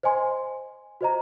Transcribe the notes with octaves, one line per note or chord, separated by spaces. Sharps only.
C5 D#5 G#5 C6
F#4 C5 D#5 A#5